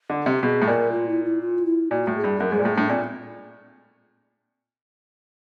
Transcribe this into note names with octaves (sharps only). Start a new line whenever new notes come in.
D3
C3 G4
B2 G#4
A2
A#2 A#4
F4
E4
E4
F4
E4
A#2 F#4
A2
G#4
G2
F#2 A#4
G#2 G#4
A#2
A2 G#4
A2 D4
A#2 C4